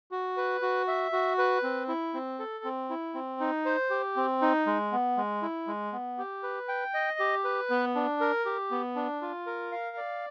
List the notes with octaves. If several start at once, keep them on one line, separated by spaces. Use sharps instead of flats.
F#4
B4
F#4
E5
F#4
B4
C4
E4
C4
A4
C4
E4
C4
D#4
C5
G4
C4
D#4
G#3
B3
G#3
E4
G#3
B3
G4
B4
G5
D#5
G4
B4
B3
D4
A#4
G4
B3
D4
F4
A#4
F5
D5